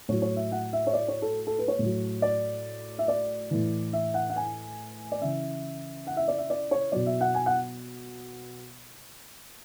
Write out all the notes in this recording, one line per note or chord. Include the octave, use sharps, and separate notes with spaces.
A2 F#3 C#5
C#5
E5
F#5
E5
C#5
D5
C#5
A4
A4
B4
C#5
A2
F#3
D5
E5
D5
A2 E3
E5
F#5
F#5
G#5
D5
C#3 E3 E5
F#5
E5
D5
E5
D5
C#5
B2 F#3 D5
E5
F#5
G#5
F#5